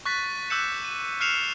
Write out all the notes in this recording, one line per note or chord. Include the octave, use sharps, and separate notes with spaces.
C#6 F#6 A6 B6
D6 E6 F#6 G6 C#7 E7
D#7
F6 F#6 C7 C#7 E7 F7